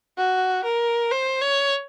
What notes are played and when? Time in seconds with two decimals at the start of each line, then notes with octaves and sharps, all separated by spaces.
0.18 F#4
0.64 A#4
1.11 C5
1.41 C#5